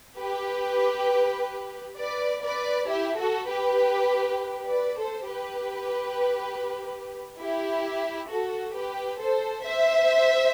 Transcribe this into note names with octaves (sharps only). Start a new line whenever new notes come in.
G4 B4
B4 D5
B4 D5
E4 G4
F#4 A4
G4 B4
B4 D5
A4 C5
G4 B4
E4 G4
F#4 A4
G4 B4
A4 C5
C5 E5